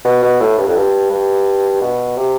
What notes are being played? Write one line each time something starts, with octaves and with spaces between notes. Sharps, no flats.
B2
B2
A2
G2
F2
G2
G2
B2
C3